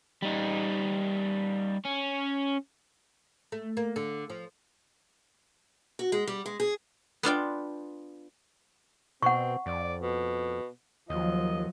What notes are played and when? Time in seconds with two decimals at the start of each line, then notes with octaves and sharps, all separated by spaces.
0.22 G3 D#4
1.85 C#4
3.52 A3
3.77 A#3
3.96 D3
4.30 F3
5.99 F#4
6.12 G#3
6.27 G3
6.46 G#3
6.60 G#4
7.23 B3 D4 F4 G5
9.23 B2 C4 F#5 C#6
9.66 F2 D5
10.00 B2
11.10 D#2 F3 F#3 D#5